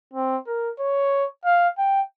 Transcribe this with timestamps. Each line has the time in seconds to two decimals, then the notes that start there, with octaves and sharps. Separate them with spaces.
0.14 C4
0.47 A#4
0.80 C#5
1.45 F5
1.78 G5